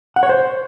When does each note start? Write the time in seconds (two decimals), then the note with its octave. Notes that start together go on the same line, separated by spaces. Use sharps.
0.16 F#5
0.23 C#5
0.29 C5